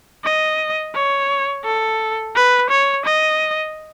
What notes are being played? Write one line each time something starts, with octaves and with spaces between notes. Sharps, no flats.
D#5
C#5
A4
B4
C#5
D#5